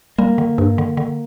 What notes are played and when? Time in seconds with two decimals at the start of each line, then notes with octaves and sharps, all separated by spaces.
0.18 G3 A#3
0.38 D3
0.58 G2
0.78 D3
0.97 D3